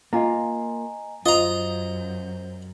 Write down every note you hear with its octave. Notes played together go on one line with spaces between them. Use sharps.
A#3 F4 D#5 G#5 A#5
F#2 F4 C5 D#5 A#5